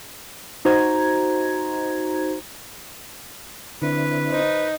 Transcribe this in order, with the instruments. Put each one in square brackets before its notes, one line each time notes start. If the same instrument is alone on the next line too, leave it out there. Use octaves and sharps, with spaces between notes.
[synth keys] D#4 F#4 C5 A#5 G#6
[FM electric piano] D3 [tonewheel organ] C4 D4 E4 [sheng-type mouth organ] B4
[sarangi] D#4 [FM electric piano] C5